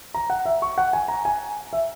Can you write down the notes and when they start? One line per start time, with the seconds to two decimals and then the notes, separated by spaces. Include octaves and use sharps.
0.14 A#5
0.30 F#5
0.45 E5
0.62 C#6
0.78 F#5
0.93 G#5
1.08 A#5
1.25 G#5
1.73 E5